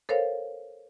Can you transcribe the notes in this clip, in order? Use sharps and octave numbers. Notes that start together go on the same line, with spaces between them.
A4 A#4 C5 C#5 F5